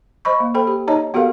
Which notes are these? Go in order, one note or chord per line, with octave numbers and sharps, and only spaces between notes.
C5 D#5 B5 C#6
A#3
A4 C5 G5 B5
G4
D#4 C#5 D#5 A5 A#5
B3 F#4 G4 A4 A#4 F5